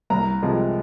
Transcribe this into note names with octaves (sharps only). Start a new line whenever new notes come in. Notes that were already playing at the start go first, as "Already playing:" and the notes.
C2 A#5
C3 F3 G#3